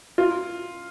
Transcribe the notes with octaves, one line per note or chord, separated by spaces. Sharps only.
F4